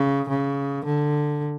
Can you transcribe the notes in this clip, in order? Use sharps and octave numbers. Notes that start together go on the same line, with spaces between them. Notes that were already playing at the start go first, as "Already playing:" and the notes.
Already playing: C#3
C#3
D3